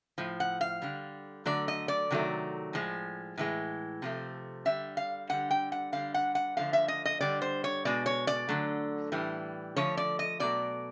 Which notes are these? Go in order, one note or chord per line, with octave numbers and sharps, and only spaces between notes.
A2 F3
F#5
F5
D3 G3
D3 F#3 A3 D5
D#5
D5
C3 D#3 F#3 A3
A2 F3 G#3
A2 E3 G#3
C3 F3 A3
D3 G3 E5
F5
D3 G3 F#5
G5
F#5
D3 G3 F5
F#5
F#5
D3 F3 A3 F5
E5
D#5
D#5
D3 G3 D5
C5
C#5
B2 G#3 D5
C#5
D5
D3 F#3 A3
A2 E3 G3
D3 F3 A3 C#5
D5
D#5
B2 F#3 A3 D5